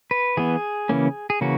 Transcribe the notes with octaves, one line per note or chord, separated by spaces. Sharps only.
B4
E3 B3 G#4
C#3 E3 A#3 C#4
G#4
C#3 E3 A#3 C#4 F#4